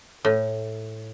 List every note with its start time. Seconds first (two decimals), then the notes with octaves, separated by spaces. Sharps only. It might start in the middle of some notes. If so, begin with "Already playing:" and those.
0.25 A2